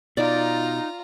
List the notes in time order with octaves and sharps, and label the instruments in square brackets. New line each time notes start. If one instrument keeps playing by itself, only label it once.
[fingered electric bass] B2 [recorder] D#4 [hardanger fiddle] F4 A#5 [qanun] D5